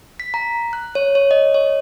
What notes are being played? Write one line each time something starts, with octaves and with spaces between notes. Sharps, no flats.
B6
A#5
F#6
C#5
C#5
D#5
C#5